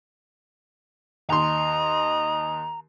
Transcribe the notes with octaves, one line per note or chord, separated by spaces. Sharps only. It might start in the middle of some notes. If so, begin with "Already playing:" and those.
D#2 D#5 A#5 C6